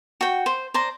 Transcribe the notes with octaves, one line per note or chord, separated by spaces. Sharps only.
F#4 G5
C5
C5 D5 A#5